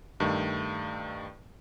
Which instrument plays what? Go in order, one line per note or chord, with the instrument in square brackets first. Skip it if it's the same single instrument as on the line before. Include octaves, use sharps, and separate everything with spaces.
[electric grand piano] G2 D#3 A3